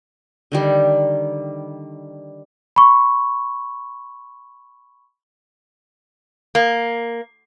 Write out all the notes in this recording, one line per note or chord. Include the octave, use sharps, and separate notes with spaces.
D3 D#3 G3
B5 C#6
A#3